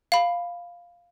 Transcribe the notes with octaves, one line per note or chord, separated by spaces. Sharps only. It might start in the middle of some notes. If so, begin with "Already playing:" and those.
F5 B5